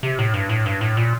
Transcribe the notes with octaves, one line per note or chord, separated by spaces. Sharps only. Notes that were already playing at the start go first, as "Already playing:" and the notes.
C3
A2
G2
A2
G2
A2
A#2